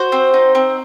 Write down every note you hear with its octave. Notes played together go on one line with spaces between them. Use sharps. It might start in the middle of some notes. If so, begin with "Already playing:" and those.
Already playing: F#4 C5
C4
D#4
C4